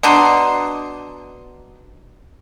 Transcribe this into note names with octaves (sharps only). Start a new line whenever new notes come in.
B2 D4 D#4 C6